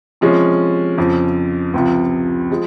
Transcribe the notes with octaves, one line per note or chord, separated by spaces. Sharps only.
C3 F3 G#3 C#4
F2 C#3 F3
C#2 C3 F3
F3 G#3